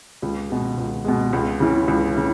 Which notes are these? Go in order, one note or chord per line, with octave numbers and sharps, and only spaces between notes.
C#2
B2 G#3
C#2
B2 G#3
C#2
C#3 E3
C#2
C#3 E3